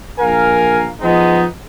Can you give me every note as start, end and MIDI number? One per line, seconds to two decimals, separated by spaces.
0.20 0.86 34
0.20 0.86 70
0.20 0.86 77
0.20 0.86 80
1.01 1.43 53
1.01 1.43 56
1.01 1.43 59
1.01 1.43 63